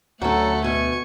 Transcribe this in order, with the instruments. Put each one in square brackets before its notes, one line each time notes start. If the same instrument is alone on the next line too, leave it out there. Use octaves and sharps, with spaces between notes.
[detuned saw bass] D2 [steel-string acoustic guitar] F#3 C#4 [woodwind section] A3 [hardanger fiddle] A4 F#5
[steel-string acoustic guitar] B2 [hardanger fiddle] G#5 C#6